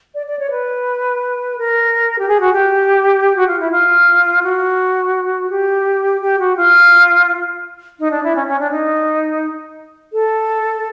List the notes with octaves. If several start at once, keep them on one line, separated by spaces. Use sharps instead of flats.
D5
D5
C#5
B4
A#4
G4
G#4
F#4
G4
F#4
F4
E4
F4
F#4
G4
G4
F#4
F4
D#4
D4
E4
C#4
C#4
D4
D#4
A4